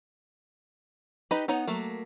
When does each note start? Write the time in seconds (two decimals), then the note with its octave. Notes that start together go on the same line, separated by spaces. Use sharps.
1.31 D#4 G4 B4 D#5 B5
1.48 B3 D#4 C#5 F#5
1.68 F#3 A3 A#3